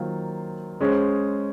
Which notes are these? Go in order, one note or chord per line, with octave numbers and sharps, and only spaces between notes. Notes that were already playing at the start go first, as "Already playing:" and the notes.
Already playing: D#3 F#3 A#3 F4 C5
G#3 C#4 G#4 C5